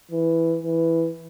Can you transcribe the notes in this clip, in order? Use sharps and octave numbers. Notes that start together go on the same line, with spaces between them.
E3
E3